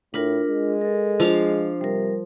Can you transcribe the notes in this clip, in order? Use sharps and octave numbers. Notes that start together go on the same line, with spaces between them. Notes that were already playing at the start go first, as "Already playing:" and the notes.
A2 D4 F4 A#4 B5
G#3
A4 A#4
F3 D4 F5
C3 G3 A#4